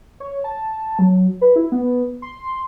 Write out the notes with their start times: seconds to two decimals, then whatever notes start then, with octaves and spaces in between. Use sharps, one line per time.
0.20 C#5
0.44 A5
0.99 F#3
1.41 B4
1.56 E4
1.72 B3
2.22 C6